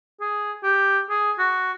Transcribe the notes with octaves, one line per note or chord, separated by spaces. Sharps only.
G#4
G4
G#4
F#4